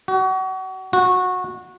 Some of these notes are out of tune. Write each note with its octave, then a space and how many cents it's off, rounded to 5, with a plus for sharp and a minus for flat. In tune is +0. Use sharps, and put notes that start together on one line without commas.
F#4 +30
F#4 -20